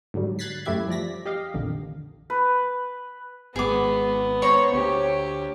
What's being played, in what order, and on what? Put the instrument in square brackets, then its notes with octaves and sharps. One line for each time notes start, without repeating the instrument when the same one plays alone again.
[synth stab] G#2 D3 F#3 G3
F#6 G#6 A6 B6 C7
F#2 A3 E4 G4 E5 G#6
F3 G3 D5 A#6 B6
G4 D#5 F5
A#1 F2 D3 D#3
[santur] B4
[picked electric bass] G#1 G#3 [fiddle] B3 [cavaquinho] G#4 D6
[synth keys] C5 C#5 A#5 [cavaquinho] C#6
[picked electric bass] D2 [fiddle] G4